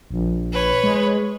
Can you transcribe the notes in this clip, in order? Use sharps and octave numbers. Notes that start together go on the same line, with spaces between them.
A#1
B4 C#5
G#3